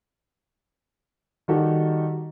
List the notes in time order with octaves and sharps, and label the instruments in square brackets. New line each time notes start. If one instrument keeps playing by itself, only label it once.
[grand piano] D#3 G3 D#4 F#4 G4 A4